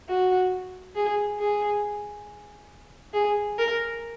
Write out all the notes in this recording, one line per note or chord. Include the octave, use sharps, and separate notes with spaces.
F#4
G#4
G#4
G#4
A#4